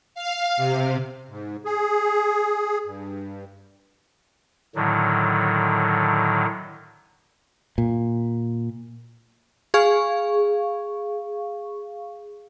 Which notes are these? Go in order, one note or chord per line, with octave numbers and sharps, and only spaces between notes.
F5
C3
G#2
G#4
G2
A2 D3 D#3 F#3
A#2
G#4 F5 C#6